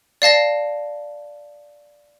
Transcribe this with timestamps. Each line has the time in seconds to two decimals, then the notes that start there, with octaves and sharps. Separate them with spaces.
0.22 D5 F5 A5 A#6